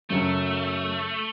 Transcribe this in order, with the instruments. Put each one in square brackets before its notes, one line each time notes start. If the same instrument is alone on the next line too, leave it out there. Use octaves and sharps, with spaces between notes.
[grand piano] F#2 C#3 F#3 C#4 [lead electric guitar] A3